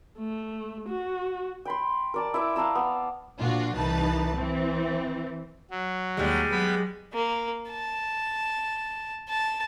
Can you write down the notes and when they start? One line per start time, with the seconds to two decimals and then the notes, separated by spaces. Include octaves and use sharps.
0.19 A3
0.89 F#4
1.65 G5 B5 C6
2.14 A#4 D5 A5
2.34 E4 E5 D6
2.56 F5 A5 A#5 E6
2.75 B3
3.38 A#2 F3 D4 F4 F#4
3.76 C2 E3 D#4 B4 A5
4.36 E3 C4
5.70 F#3
6.17 D#2 G3 G#3
6.52 F#3 B3 B5
7.14 A#3
7.72 A5
9.29 A5